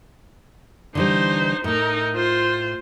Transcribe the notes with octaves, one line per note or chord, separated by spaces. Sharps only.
D3 E3 G3 D#4 C5
A2 A3 D#4 A#4
F4 C5